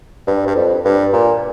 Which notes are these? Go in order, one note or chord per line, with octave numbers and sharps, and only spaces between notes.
G2
G2
F2
G2
A#2